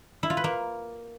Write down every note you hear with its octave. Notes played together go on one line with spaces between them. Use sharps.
E4
F4
B4
A#3